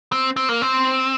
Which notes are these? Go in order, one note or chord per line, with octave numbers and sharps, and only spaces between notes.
C4
C4
A#3
C4